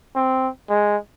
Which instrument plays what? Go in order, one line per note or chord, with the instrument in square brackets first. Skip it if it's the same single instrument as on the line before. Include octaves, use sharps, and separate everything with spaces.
[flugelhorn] C4
G#3